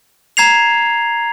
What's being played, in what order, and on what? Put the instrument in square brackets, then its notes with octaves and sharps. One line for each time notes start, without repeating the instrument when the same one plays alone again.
[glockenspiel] A#5 G#6 C7 F7